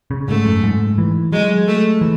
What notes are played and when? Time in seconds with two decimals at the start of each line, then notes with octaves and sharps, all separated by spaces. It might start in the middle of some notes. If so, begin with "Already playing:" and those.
0.11 C#3
0.28 G#2 A3
0.46 F#2
0.63 G#2
0.98 E3
1.32 F#3 G#3
1.67 A3
2.01 E3